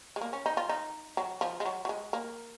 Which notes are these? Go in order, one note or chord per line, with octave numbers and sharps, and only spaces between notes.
G#3
A#3
C#4
D#4
F4
D#4
F#3
F3
G#3
F#3
F#3
G#3
A#3